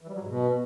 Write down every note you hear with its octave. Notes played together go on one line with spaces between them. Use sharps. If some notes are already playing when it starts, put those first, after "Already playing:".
E3
G3
F#3
G#2
B2